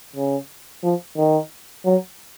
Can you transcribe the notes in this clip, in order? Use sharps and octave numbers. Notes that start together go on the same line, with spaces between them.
C#3
F3
D#3
F#3